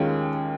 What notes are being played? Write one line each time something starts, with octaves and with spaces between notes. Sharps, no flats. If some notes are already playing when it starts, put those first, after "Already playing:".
Already playing: D#2 D#3 G#3 C#4 F4